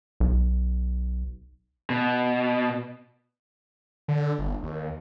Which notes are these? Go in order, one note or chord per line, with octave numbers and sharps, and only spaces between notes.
B1
B2
D3
G1
D#2